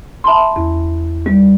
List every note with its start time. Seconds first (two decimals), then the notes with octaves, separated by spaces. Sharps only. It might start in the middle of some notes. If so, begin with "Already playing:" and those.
0.24 E5 A5 B5 C6
0.56 E2
1.26 G3